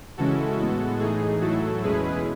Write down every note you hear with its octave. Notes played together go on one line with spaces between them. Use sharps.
C#3 E3 G#3 C#4 E4 F#4 A4
A2 G#3 B3
A2 E3 A3 D#4 G#4
A2 F#3 A3 E4 F#4 A4
E2 B2 G#3 C#4 E4 G#4 B4